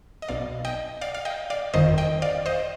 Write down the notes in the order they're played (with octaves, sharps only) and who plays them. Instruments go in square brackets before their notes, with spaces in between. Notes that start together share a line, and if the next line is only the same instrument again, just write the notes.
[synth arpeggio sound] D#5
B1 B2 D5 F5
D#5 G5
D5 F5
F5
D#5 G5
D5 F5
G1 F2 D#3 C5 D#5
D#5 G5
D5 F5
C5 D#5